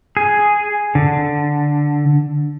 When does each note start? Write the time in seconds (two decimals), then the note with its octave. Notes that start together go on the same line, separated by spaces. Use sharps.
0.17 G#4
0.95 D3